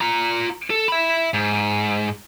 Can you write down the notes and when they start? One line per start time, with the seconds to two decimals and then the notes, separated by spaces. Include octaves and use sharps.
0.01 F4 A#5
0.70 A4
0.88 E5 B5
1.34 G#2